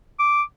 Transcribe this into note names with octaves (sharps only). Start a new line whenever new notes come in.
D6